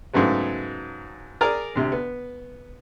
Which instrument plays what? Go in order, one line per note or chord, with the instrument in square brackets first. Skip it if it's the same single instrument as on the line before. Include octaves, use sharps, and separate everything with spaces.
[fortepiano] G#2 C#3 F#3 A3 B3
G#4 A#4 D5 G#5 A#5
D2 C3
B3